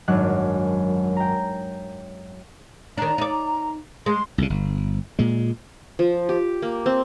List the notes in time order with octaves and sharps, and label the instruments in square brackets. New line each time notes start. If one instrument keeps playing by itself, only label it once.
[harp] G#1 F#2 F#3 D4 F#4 F#6
G5 A#5
[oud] D#3 D4 [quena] A#5
[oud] D#4 D5
[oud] G#3 [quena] C6
[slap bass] C2 C#3
G1
A#2 G#3
[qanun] F3
G4
A#3
C4